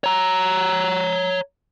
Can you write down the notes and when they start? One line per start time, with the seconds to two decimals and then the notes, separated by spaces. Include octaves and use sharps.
0.04 C#5 A#5